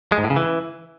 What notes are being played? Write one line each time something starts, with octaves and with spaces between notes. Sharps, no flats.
G#3
G#2
A2
C#3
E3